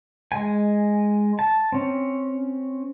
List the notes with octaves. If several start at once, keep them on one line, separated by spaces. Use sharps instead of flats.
G#3 G#5
A5
C4 C#4